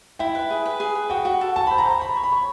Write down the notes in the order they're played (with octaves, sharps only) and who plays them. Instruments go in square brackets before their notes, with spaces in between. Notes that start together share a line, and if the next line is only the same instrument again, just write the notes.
[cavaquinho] E4 [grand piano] G5
[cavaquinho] B4
G#4
B4
G#4
B4
[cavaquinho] F#4 [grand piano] G5
[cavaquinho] F#4
A4
[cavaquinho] F#4 [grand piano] A5
[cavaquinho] C5 [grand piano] B5
[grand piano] A#5
[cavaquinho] C5
[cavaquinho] C#5 [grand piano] B5
[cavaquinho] C#5
[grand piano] B5
[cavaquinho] C#5